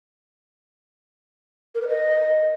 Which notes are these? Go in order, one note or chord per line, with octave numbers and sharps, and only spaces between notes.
A#4
B4
D#5